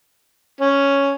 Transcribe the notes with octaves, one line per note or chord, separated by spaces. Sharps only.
C#4